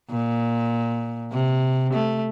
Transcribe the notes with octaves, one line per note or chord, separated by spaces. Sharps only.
A#2
C3
A3